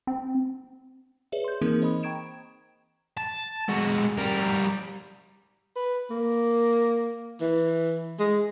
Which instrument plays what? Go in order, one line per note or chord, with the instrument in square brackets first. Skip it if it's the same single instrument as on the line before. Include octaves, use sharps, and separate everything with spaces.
[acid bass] C4
[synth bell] G#4 B4 C#5 D5 E5
C6 G6
E3 A#3 C4 D#4 G#4 A#4
C5 D#5 B5 D#6
G5 A#5 C#6 G#6 D7 E7
[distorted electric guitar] A5
G#3 F#4
G3 A#4
[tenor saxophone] B4
A#3
E3
G#3